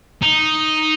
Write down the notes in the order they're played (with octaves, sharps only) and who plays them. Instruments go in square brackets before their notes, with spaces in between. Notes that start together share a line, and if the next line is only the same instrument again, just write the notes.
[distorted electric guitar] D#4